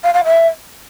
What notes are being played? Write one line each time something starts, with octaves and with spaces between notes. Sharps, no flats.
F5
F5
E5